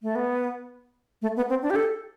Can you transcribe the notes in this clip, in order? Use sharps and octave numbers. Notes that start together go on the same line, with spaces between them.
A3
B3
A3
B3
C4
D4
G4
A4